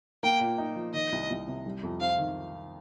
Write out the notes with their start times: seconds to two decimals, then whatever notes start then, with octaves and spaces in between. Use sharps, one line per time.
0.23 A#3 G5
0.40 A#2
0.58 D#4
0.76 F3
0.94 D#3 D#5
1.12 C2
1.30 C2
1.48 C3
1.66 G3
1.83 F2
2.00 C4 F5
2.18 D#3